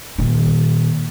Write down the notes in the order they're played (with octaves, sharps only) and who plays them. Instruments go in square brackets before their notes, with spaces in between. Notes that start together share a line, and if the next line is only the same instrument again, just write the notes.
[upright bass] A#2 D#3